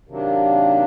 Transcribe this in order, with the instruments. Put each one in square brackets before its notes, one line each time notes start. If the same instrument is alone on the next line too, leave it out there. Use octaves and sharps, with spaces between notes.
[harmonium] C3 D#3 F#3 A#3 D4